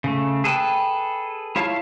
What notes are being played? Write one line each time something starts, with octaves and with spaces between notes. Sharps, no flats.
C#3 A3
G#4 A4 B4 G5 A5
E4 F4 C#5 F5 A5